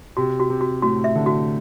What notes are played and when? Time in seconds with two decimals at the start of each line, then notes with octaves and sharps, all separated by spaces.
0.17 C3 F#4
0.40 F#4
0.50 C3
0.61 F#4
0.82 A2 F#4
1.04 E5
1.15 D3
1.26 F#4